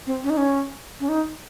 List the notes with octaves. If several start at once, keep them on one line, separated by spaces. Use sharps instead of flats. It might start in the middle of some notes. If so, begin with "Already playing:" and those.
C4
C#4
D#4
C#4
C#4
D#4